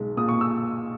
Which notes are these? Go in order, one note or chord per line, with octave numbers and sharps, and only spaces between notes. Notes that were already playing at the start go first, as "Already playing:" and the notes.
Already playing: B1 G#3
A#2 D#6
C#6
E6